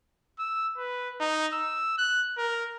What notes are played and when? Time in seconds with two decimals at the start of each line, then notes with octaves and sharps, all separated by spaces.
0.39 E6
0.77 B4
1.20 D#4
1.53 E6
1.98 F#6
2.38 A#4